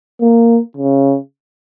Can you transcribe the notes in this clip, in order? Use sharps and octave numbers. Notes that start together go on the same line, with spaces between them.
A#3
C#3